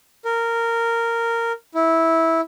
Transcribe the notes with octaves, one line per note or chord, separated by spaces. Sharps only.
A#4
E4